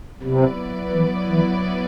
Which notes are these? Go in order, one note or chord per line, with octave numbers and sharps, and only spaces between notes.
C3 F#3 B3 E4 B4 D5
E3
E3